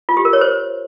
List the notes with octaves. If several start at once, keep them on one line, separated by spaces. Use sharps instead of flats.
F4
G4
A#4
C#5
C5